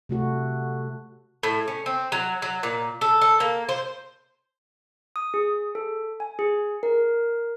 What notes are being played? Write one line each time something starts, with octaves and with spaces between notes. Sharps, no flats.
C3 A3 F#4
A2
C#4
C4
F#3
F#3
A#2
A4
A4
A#3
C5
D#6
G#4
A4
G#5
G#4
A#4